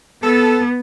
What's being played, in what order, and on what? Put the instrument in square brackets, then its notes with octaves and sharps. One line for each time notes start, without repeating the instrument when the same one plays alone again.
[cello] B3 [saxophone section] A4